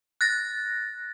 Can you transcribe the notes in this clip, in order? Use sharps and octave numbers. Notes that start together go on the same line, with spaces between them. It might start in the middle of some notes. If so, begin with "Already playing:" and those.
F#6 A6 A#6